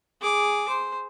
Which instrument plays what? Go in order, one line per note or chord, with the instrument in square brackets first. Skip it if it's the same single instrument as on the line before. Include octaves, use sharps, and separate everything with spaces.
[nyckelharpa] G#4 D6
C5